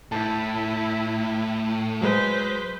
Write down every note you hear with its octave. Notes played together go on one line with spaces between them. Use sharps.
A2 E4 A5
F#3 G#3 B4 C5